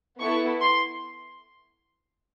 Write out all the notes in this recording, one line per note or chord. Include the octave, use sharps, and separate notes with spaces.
B3 E4 A4 C#6
C6